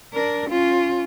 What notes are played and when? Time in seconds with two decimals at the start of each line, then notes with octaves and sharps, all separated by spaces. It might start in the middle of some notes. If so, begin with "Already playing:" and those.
0.13 D4 A#4
0.50 C#4 F4